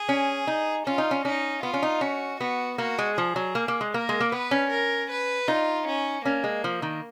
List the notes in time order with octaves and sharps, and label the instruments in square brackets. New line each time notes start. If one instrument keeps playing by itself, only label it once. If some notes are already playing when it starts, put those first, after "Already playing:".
Already playing: [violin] G#4
[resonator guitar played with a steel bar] C#4
D#4
[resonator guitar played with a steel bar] C#4 [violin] F4
[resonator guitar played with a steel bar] D#4
C#4
[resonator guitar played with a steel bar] C#4 [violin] D#4
[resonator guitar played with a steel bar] B3 [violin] F4
[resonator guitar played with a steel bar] C#4
D#4
[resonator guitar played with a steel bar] C#4 [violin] F#4
[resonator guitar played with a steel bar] B3 [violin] F#4
[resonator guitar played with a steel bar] A#3 [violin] F#4
[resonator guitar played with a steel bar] G#3
[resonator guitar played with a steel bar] F3 [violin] G#4
[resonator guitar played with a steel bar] F#3
A#3
A#3
G#3
[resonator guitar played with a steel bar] A#3 [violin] A#4
[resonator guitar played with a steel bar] G#3
A#3
[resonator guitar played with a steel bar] B3 [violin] B4
[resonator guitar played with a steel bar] C#4
[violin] A#4
B4
[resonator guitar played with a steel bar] D#4 [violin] F4
[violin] C#4
[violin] A#3 [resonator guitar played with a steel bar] C#4
[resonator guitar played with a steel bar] G#3
F3
D#3